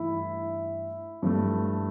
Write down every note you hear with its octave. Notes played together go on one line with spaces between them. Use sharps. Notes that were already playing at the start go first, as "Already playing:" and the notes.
Already playing: G2 E3 A3 E4
G2 F3 A3